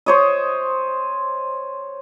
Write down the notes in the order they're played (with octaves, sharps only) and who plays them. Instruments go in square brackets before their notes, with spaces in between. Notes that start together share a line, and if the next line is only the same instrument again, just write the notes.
[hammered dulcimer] C5 C#5 D#5